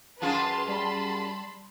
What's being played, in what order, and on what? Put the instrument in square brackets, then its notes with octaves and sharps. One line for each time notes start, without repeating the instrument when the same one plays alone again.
[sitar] F#2 F4 G#4 [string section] B4 A5 C6
[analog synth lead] G3 [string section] A5 B5 C6